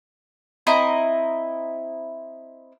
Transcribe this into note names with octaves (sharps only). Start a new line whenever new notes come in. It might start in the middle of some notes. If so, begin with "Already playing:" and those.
C4 E4 D#5 A#5